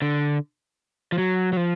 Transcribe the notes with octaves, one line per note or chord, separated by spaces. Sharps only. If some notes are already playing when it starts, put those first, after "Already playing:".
D3
F3
F#3
F#3
F3